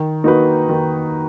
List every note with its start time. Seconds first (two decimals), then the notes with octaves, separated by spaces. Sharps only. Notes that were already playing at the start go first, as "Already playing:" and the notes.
Already playing: D#3
0.24 A#3 D#4 F#4 B4
0.69 D#3